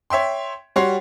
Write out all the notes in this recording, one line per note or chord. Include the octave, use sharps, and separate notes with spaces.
C#5 E5 G5 C6
G3 F#4 C#5 C6 C7